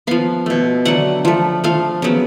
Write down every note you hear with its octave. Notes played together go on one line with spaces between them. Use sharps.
F3 B3 F5
B2 A3
D3 F#3 A3 F#5
F3 A3
F3 A3 F5
C#3 F#3 B3